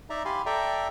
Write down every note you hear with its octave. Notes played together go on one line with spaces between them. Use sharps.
D#4 D5 E5 A#5
G4 F5 G#5 B5 C6
A4 D5 E5 G5 A#5